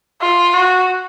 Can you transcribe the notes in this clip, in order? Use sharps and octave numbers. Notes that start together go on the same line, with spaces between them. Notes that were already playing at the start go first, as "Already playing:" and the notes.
F4
F#4